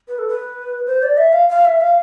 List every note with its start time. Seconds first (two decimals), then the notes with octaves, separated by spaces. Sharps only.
0.08 B4
0.19 A4
0.28 B4
0.87 C5
1.03 D5
1.17 E5
1.33 F5
1.49 F5
1.65 E5
1.81 F5